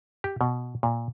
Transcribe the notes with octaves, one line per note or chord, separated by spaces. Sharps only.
G4
B2
A#2